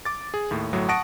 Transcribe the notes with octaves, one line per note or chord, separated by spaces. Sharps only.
D6 A6
G#4
D#2 A2
G1 A2 F#3
F#5 A5 C#6 D#6 A#6 D7